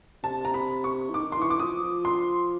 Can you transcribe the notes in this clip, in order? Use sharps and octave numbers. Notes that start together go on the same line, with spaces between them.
C3 A5
A#5
B5
C#6
E3
D#3 D6
C6
E3
C#6
D6
F3 D#6
F3
C6